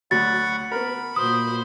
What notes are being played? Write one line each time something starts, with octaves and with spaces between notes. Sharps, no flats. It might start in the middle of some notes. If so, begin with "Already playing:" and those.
D2 F#3 F#5 B5 C#6 A6
B3 A#4 B5
A#2 F#4 C5 D#6